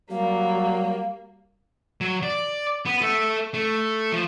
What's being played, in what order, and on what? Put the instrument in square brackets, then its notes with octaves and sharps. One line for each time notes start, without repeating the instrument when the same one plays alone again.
[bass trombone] F#3 [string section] G3 [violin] A#3 [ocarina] F5
[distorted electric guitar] F#3
D5
B3
A4 E5
A3
F3